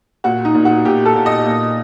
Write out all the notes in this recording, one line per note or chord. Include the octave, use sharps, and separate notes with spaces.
A#2 F#4
D#4
A#2
F#4
A#2 G4
A4
A#2
D#5
A#2